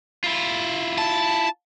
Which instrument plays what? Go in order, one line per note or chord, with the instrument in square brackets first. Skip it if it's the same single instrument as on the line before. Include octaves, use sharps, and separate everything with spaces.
[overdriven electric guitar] E4 F4
[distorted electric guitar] A5